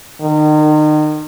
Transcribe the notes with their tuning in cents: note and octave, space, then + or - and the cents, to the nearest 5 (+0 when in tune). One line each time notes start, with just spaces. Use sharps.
D#3 -35